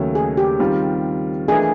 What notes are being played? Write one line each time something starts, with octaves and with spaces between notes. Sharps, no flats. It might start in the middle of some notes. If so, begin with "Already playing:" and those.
Already playing: D#2 C#3 F#3 A3
G#4
G4
D#3 G3 C4 F4
E3 A3 D4 F4 G#4 A#4